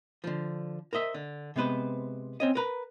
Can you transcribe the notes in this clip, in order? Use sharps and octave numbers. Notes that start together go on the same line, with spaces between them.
D3 F3
A#4 C5 D#5 E5
D3
C3 G#3 B3 B4 C5
C4 C#4 D#5
A#4 B4 A#5